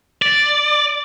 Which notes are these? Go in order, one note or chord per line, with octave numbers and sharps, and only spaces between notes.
D5